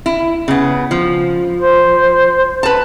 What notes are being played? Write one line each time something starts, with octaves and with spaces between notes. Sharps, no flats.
E4
C#3 B3
F3
C5
B4 A5